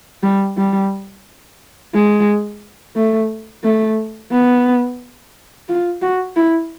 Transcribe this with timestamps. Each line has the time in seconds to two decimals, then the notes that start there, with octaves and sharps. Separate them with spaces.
0.23 G3
0.57 G3
1.94 G#3
2.96 A3
3.64 A3
4.31 B3
5.69 F4
6.02 F#4
6.36 E4